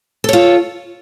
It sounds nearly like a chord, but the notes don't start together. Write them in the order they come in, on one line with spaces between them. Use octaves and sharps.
A4 C#5 F4